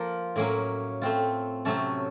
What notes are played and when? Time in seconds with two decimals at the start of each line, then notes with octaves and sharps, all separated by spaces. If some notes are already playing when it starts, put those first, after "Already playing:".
Already playing: F3 A#3 F4 A#4
0.36 A2 F#3 A#3 C#4
1.02 A3 C4 F4
1.65 C3 F#3 A3 C#4 A4